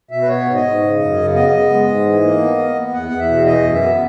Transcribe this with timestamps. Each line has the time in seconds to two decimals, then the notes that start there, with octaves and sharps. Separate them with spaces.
0.11 B2 E5
0.22 B4
0.28 B3 C#5
0.46 G#2
0.55 D#5
0.64 G#2
0.82 C#3
0.99 F#2
1.17 C#3
1.34 B3 D#5
1.52 B3
1.70 G#3
1.88 G#2
2.05 E3
2.22 A#3
2.40 B3
2.58 B3
2.76 B3
2.93 E2 F#5
3.08 E2 F#5
3.20 E5
3.29 B2
3.46 E3 D#5
3.64 F#2
3.73 E5
3.81 B3